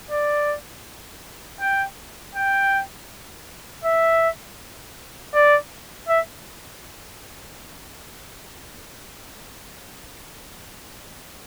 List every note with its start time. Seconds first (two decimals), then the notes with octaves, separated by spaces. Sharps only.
0.11 D5
1.61 G5
2.35 G5
3.84 E5
5.34 D5
6.09 E5